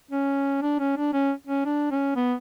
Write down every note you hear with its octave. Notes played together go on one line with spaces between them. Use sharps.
C#4
D4
C#4
D4
C#4
C#4
D4
C#4
B3